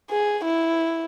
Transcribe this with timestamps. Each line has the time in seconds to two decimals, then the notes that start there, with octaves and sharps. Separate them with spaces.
0.10 G#4
0.44 E4